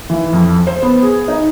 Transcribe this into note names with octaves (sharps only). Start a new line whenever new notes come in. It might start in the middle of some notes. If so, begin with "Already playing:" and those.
E3
F2
C5
B3
G#4
D#4